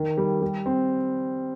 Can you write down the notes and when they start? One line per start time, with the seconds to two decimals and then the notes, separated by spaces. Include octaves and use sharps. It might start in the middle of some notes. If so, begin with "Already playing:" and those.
Already playing: D#3
0.18 G3
0.42 G3
0.66 C4